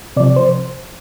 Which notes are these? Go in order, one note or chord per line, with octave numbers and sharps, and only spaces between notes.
C3 F3 D5
C5